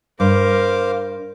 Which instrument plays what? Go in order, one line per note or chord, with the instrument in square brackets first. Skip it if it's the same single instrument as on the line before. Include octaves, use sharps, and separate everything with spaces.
[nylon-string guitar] G2 [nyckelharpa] A#4 [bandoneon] C5 F5 D6